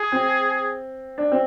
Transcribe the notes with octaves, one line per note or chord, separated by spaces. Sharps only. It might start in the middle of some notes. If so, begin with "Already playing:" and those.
Already playing: G#4
C4
D4
C4